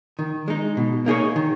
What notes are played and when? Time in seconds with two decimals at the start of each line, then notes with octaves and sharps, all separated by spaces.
0.19 D#3
0.48 G#3 D#4
0.77 B2
1.06 A#3 D#4 G#4 C#5
1.36 D#3